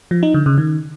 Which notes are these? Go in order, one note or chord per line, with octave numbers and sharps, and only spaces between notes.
F3
D#4
D3
C#3
D#3